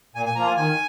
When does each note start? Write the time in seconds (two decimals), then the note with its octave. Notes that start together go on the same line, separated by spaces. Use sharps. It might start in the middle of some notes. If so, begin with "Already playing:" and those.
0.15 A#2 G#5
0.26 G#5
0.35 F3 A#3 F4 A#5
0.47 G#5
0.57 D#3 G#5